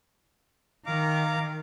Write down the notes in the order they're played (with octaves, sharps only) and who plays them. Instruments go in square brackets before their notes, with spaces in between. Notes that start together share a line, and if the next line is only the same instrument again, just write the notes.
[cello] D#3 [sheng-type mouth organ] F5 A#5 D6